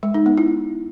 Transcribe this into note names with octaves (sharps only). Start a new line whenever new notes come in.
G#3
D#4
B3
E4